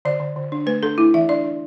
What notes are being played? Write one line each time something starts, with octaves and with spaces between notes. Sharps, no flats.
D3 D5
D3
D3
D4
A3 B4
D4 A4
A3 E4
E3 E5
D4 D5
D4